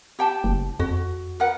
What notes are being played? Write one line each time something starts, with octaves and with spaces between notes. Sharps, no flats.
G4 G5 A5
F#1
F2 F#4
A#4 B4 F#5